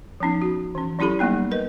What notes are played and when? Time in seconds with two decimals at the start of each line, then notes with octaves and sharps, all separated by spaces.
0.20 F3 B3 C#4 D#4
0.42 F#4
0.75 E3 C#4
0.99 F#3 C#4 E4 G4 A4 B5
1.19 F#3 G3 A#3 B3 D#4
1.51 A#4 B4 D#5